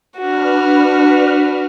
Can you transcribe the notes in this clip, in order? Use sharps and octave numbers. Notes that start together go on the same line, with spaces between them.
D4 F#4 B4 F6